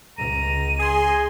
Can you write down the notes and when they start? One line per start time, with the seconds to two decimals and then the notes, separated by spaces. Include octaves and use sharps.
0.18 C#2 A#5 D#7
0.79 G#4 G#5 C6